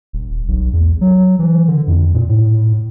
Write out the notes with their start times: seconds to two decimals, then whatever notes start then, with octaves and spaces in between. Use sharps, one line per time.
0.13 D#1
0.48 B1
0.73 E2
1.01 F#3
1.39 E3
1.68 D3
1.87 F2
2.14 A#2
2.28 A2